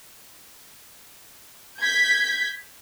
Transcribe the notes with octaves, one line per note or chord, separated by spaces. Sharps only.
G6 G#6 B6